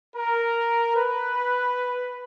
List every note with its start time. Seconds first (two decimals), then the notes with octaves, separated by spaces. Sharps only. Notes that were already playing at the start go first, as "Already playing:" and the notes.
0.16 A#4
0.96 B4